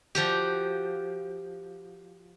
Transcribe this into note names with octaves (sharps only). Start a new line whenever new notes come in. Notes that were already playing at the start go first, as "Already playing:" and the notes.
F3 F#4 G4